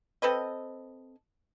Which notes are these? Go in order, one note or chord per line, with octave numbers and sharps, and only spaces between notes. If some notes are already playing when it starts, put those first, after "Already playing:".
C4 A4 B4 D#5